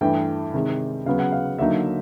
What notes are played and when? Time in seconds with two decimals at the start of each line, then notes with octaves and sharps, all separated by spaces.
0.01 G2 E3 A3 G5
0.54 C3 D#3 G#3
1.06 C#3 F#3 B3 F5
1.19 F#5
1.32 F5
1.59 D3 F#3 A#3 D#4 E5